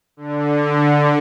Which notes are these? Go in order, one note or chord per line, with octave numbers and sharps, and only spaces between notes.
D3